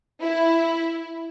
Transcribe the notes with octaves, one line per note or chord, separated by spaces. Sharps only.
E4